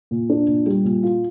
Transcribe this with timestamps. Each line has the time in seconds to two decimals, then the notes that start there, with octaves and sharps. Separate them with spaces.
0.11 A#2
0.30 D4
0.48 A#2
0.66 G3
0.84 A#2
1.03 F4